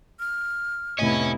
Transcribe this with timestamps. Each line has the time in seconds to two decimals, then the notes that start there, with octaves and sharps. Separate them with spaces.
0.20 F6
0.98 F1 A2 B3 E4 C#5 D#5 G#5